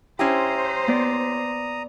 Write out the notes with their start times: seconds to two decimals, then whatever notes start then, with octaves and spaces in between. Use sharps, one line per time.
0.19 C#4 E4 G4 C5 A#5 D#6
0.88 B3 D5